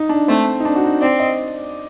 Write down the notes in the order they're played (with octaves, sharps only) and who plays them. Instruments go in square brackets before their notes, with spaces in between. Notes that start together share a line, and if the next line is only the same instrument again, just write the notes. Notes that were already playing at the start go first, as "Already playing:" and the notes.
Already playing: [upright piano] D#4
D4
[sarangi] A3 [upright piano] C4
[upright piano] D#4
D4
F#4
D#4
[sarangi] C4 [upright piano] D5
[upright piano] D#5